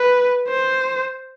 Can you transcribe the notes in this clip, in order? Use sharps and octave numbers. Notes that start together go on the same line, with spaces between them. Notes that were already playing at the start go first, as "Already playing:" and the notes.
Already playing: B4
C5